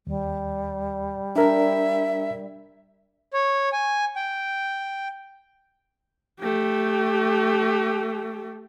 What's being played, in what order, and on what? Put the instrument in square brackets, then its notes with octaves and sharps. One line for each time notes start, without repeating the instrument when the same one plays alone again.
[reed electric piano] D#2 [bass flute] G3
[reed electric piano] D4 A#4 [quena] E5
[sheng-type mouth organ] C#5
G#5
G5
[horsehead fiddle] A3 G4